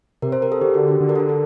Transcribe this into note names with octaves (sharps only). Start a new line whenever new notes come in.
C3 A#4
C5
A#4
A4
D3 G4
F#4
G4
D3
A#4
A4
A#4
A4